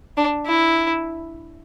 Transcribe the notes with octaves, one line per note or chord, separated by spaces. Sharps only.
D4
E4